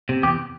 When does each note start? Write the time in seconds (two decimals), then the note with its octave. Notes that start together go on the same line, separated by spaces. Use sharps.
0.09 C3
0.23 E2 G4